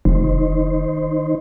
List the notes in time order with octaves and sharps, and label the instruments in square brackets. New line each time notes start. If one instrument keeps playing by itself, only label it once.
[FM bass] F1 [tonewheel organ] D#3 D#4 C5